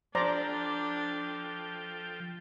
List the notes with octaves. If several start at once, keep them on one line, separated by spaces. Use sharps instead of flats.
F3 D4 A4 C5 D5 G5 A#5